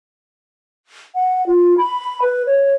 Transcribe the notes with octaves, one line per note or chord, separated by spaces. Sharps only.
F#5
F4
B5
B4
C#5